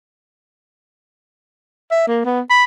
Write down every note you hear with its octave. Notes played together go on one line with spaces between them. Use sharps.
E5
A#3
B3
B5